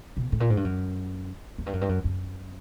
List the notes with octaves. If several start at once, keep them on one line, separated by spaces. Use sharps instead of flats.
B2
A2
A#2
G#2
G2
F#2
F#2
G2
F#2
G2
F#2
F#2